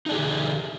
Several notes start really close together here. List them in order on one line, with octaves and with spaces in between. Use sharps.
D#4 D4 G#4 G4 D3